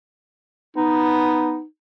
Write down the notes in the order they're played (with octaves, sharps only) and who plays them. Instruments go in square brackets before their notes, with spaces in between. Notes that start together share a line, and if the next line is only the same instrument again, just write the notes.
[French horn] B3 [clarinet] D#4